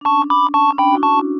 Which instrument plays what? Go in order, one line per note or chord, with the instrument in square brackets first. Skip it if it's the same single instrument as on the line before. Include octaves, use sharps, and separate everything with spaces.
[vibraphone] D4
[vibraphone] C#4 [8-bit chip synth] A5 C#6
[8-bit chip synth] B5 D6
A5 C#6
[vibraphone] C#4
[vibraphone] D4 [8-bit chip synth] G5 B5
[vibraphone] F#4
E4
[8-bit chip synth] A5 C#6
[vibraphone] F#4